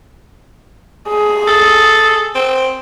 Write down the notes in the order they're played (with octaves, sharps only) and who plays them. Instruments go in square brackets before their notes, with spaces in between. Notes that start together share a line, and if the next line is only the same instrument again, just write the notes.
[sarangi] G#4
[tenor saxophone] A4
C4